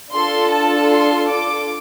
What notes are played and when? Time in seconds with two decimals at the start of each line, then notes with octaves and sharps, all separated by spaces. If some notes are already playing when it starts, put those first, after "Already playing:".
0.12 D4 F4 A4 C6
0.51 A5
0.91 C6
1.30 D6